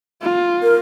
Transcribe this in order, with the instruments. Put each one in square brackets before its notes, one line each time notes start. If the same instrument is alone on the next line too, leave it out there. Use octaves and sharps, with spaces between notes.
[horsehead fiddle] F4
[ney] A#4